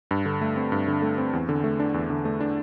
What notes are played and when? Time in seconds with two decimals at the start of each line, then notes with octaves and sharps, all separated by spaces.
0.11 G2
0.26 D3
0.41 A3
0.56 C4
0.72 G2
0.88 D3
1.02 A3
1.18 C4
1.33 E2
1.49 D3
1.64 A3
1.80 D4
1.94 E2
2.10 D3
2.25 A3
2.40 D4